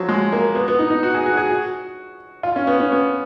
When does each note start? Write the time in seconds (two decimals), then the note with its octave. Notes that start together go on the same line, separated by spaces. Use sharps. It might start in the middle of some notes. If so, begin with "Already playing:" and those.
Already playing: F3 F#3
0.09 G#3
0.32 A#3
0.55 B3
0.68 B3
0.79 D#4
0.90 D#4
1.03 F#4
1.14 G#4
1.26 F#4
1.37 G#4
1.49 F#4
2.43 F4
2.56 C#4
2.67 B3
2.80 C#4
2.92 B3